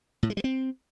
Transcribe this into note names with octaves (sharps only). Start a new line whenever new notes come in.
A2
G#3
G3
C4